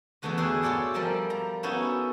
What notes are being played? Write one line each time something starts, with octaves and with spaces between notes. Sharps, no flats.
E2 D3 E3 A3 F#4 D#5
A3 D4 E4 G4 G#4
F4 F#4 A4 C#5 D5
F3 G3 A#4 D5 E5 G#5
A#5
B3 C#4 D#4 E4 F#4 A4